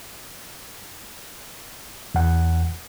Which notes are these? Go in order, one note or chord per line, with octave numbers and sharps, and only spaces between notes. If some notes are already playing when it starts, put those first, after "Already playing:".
E2 F#5